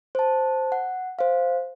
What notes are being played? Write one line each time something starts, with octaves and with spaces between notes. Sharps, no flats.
C5 A5
F#5
C5 F5